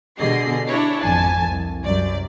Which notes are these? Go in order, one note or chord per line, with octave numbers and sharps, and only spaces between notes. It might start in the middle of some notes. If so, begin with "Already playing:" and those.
B2 D3 G4 G#4 D#5 C7
D4 E4 C#5
G#1 F2 G#5 A5
C2
C2 F#2 D5